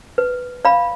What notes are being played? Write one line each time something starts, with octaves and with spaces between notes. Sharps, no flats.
B4
D5 F5 B5